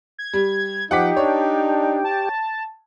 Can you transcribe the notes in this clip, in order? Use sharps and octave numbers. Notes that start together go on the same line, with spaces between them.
G#6
G3
F3 D#4 G4 F#5 D6 B6
D4 C#5
A5